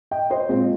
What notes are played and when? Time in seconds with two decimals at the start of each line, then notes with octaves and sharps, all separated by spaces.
0.11 D#5 G5
0.30 C5 D#5
0.49 A#2 G#3 C4